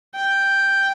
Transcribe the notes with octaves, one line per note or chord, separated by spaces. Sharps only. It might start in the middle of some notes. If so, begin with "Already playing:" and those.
G5